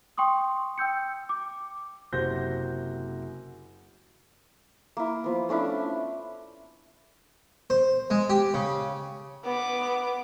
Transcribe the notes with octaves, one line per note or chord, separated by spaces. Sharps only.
G5 C6 C#6 D#6
G5 E6 G6 C#7
D6
F#1 C3 F#4 C5 G6 A#6
A#3 E4
F3 B3
A3 C#4 D4 E4
C5
G#3
G4
C#3
B3 D6